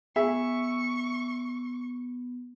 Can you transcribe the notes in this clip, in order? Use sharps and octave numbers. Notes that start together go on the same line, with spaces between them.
B3 G#4 E5 C#6